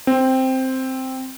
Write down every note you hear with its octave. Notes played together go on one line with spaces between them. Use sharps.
C4